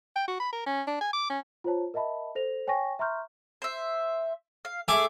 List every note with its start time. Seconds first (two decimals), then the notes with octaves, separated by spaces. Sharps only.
0.16 G5
0.27 F#4
0.40 B5
0.53 A#4
0.66 C#4
0.87 D4
1.01 G#5
1.13 D6
1.30 C#4
1.64 F4 C5 C#5 A5
1.94 A#4 D#5 E5 A5 B5
2.35 A4 C5 A#6 F7
2.67 C#5 G5 G#5 C#6 A#6
2.99 E5 A#5 C6 C#6 F6 G6
3.62 C5 E5
4.65 F5
4.88 A3 G#4 E5 G#5 D6